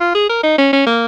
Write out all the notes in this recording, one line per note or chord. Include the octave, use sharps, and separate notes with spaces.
F4
G#4
A#4
D#4
C#4
C#4
A#3